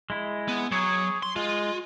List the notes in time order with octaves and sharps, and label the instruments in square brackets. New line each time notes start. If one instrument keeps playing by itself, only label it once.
[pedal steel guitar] G#3 E4
[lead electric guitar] B3
[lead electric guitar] F#3 [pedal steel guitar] G#4 C#5
[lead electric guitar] C6
[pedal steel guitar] G#3 [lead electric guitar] F4